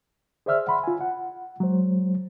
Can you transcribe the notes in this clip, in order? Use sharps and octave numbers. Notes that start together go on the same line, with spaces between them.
G#4 C5 D5 E5 E6 F6
F#5 B5 C6
F4 G#5
F#5
F#3 G#3 C5